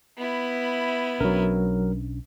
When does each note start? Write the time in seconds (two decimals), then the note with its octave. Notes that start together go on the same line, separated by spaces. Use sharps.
0.17 B3 E4
1.20 B1 F#3 C#4 D4 A#4